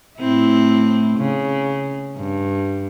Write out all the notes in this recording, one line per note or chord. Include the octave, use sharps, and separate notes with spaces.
A2 C4 E4
C#3
G2